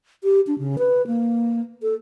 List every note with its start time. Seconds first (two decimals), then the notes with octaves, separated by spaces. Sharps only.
0.24 G4
0.47 D4
0.59 C#3
0.79 B4
1.07 A#3
1.83 A4